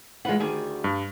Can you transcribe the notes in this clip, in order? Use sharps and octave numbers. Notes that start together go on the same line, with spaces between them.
E3 G#3 F4 B4 F#5
D2 D#3 G3 G#4
G2